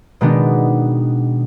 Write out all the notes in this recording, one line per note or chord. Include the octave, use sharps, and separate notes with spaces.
B2 D#3 G#3 B3 D4